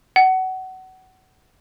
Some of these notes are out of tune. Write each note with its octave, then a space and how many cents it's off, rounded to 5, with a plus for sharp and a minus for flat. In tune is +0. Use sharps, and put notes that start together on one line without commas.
F#5 +25